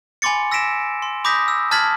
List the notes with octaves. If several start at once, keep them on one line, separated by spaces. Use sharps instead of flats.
G#5 B5 C6 D6 A6 C#7
E6 A#6 B6 D7 E7
C6
B5 D6 D#6 G6 A#6 B6
E6
A5 F6 G#6 A6 B6 F#7